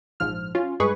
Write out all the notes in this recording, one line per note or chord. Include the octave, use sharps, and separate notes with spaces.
A#1 G#2 F3 F6
C#4 F4
G2 G#3 G#4 B4 C#6